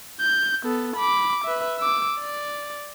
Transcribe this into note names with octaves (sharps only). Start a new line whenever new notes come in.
G6
B3 A4
B5 D6
B4 E5
D6 E6
D5